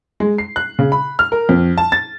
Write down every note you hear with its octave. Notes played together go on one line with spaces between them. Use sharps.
G#3
C7
F#6
C#3
B5
F6
A#4
F2
A5
A6